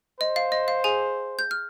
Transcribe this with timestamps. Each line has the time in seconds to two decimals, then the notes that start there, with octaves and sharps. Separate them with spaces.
0.20 C5 D#5
0.36 F5
0.52 D#5
0.68 F5
0.84 G#4 G#5
1.39 G6
1.51 F6